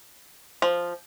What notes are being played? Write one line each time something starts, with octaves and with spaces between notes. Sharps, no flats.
F3